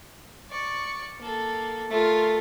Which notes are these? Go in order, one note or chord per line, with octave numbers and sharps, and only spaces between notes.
D5 C#6
A#3 A4
A3 F4 A#4